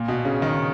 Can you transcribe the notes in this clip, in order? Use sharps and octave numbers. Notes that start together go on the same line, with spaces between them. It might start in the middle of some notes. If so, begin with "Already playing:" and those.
Already playing: A#2
B2
C#3
D#3